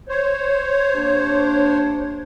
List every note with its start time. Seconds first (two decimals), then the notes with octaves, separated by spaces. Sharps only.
0.09 C5 C#5
0.94 C3 A#3 D4